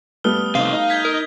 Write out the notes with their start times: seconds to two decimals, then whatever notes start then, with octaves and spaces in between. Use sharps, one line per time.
0.24 G3 A3 B3 D#6 F6 G7
0.38 D#6
0.55 C3 D#4 F5
0.73 D#4
0.90 G6 G#6 B6
1.05 A#4